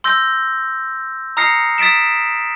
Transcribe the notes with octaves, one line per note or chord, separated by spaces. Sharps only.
C6 E6 G6 A#6
A#5 D#6 F6 A#6 C7 C#7
D#6 A6 B6 D7 E7